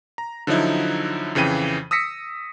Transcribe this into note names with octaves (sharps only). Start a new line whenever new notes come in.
A#5
D3 F3 F#3 D#4 E4
F2 C#3 E3 G5 D#7
D#6 E6 A#6 B6 C#7